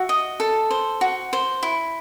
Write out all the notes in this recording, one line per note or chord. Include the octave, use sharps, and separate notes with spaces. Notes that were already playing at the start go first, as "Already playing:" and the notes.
Already playing: F#4 E5
D#5
A4
C5
F#4
C5
E4